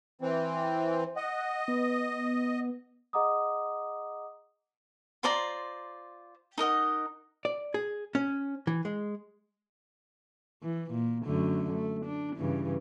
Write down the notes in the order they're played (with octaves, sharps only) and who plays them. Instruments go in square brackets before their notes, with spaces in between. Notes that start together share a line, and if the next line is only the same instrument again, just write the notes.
[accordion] E3 C4
[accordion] D#5 [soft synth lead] F#5
[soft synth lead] B3
[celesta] G#4 D#5 F#5 A#5 D6 D#6
[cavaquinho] F4 C5 D5 A#5
D#4 A#4 D#5 F#5
[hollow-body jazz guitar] D5
G#4
C#4
E3
G#3
[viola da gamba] E3
A#2
F#2 D3 A3
A3
D4
G2 C#3 E3